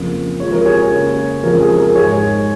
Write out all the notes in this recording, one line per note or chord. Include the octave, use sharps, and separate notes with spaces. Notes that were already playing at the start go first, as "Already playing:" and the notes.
Already playing: F2 C#3 A#3
F2 F3 G#3 C#5
A#4
G#4 C#5
C#3 A#3
F2 C#3 F3 G#3 A#4
G#4
G#4
A#4
G#2 G#3 G#4 C#5